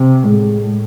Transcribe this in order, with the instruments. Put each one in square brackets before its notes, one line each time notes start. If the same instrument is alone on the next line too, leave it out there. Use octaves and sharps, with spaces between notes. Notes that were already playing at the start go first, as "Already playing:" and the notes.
Already playing: [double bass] C3
[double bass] A2 [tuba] G#3